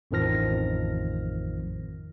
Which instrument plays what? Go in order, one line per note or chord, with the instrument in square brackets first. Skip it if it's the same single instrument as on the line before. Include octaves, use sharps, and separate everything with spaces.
[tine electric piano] A1 F2 D#3 F3 F6 A#6